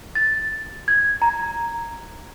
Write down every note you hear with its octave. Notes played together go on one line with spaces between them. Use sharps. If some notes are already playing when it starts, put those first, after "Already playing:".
A6
G#6
A#5